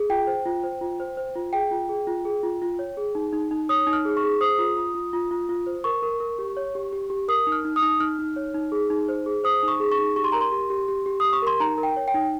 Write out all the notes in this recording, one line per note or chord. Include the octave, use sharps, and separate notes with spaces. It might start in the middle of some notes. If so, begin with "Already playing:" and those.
Already playing: G#4
F4 G5
C5
F4
C5
F4
C5
C5
F4
G#4 G5
F4
G#4
F4
G#4
F4
F4
C#5
G#4
D#4
D#4
D#4
C#5 D#6
D#4
F6
G#4
C#6
G#4
C5 D#6
F4
F4
F4
F4
F4
F4
C5
A#4 C#6
A#4
A#4
G4
C#5
G4
G4
G4
A#4 D#6
D#4
F6
D#4
D#6
D#4
D#4 F6
D#4
C#5
D#4
G#4
D#4
C5
G#4
C5 D#6
D#4
C#6
G#4
C#6
D#4
G4 C#6
C6
A#4 A#5
C6
G4
G4
G4
G4
G4 D#6
C#6
A#4 C6
D#4 A#5
A#4
G5
C#5
G5
D#4